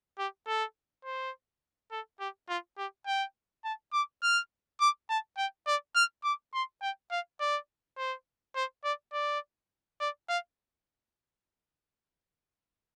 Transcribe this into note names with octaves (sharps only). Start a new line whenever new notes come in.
G4
A4
C5
A4
G4
F4
G4
G5
A5
D6
F6
D6
A5
G5
D5
F6
D6
C6
G5
F5
D5
C5
C5
D5
D5
D5
F5